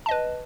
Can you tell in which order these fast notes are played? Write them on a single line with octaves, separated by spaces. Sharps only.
A5 D#5 B4